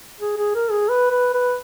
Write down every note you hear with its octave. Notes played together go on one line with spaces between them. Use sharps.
G#4
G#4
A#4
G#4
B4
B4
B4